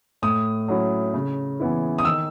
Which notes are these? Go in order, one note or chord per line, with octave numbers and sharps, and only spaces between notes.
A2 D#6
F#3 C#4 E4
C#3
E3 B3 E4
D#6
D#3 E6